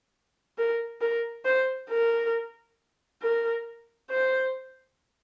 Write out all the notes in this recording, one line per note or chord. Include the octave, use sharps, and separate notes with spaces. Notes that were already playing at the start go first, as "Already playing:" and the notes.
A#4
A#4
C5
A#4
A#4
C5